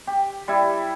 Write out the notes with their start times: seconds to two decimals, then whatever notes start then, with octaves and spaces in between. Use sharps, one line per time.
0.07 G4
0.48 G3 E4